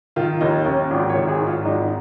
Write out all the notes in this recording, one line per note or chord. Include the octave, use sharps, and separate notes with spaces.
D#3 F4
D#2 D#4
D#2 C#4
G#1 F4
C#5
D#3
G#4
G#2
F4
G#1 D#4